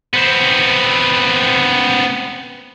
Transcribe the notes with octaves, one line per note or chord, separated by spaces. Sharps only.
B3 C4